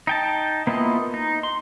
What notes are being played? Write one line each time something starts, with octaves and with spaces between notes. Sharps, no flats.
D#4 G5 A5
A#3 B3 E4 F4 D#5
D#4
C6